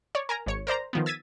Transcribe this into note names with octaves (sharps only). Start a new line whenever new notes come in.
C#5 D5
A#4 G#5 A#5
G#1 C#5 C#7
A#4 C5 D5 A#5
D#3 F3 B3
E6 G#6 A6 B6 D#7